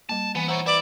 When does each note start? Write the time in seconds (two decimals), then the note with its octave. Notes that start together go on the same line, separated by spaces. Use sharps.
0.09 G3 A#3 A5
0.35 E3 B3 G#5
0.48 E4 C5 C#5 F#5 A#5
0.66 E4 B4 D5